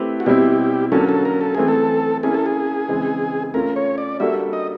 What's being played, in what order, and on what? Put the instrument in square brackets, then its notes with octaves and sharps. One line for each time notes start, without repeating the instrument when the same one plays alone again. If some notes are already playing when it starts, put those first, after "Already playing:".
Already playing: [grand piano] A3 C4 E4 G4 B4
[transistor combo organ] F#4
[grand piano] B2 G3 C4 E4 [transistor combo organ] G4
[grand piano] D3 F#3 A#3 C#4 [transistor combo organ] A4
[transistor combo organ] A4
A#4
A4
[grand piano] E3 A3 C4 [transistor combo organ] G#4
[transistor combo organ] A4
[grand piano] A#3 C#4 E4 [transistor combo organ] G#4
[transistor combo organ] A4
G#4
[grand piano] C#3 E3 G#3 C4
[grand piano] A3 C#4 F4 [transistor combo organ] A#4
[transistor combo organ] C#5
D5
[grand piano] G3 A#3 D4 F#4 A4 [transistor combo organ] E5
[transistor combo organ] D#5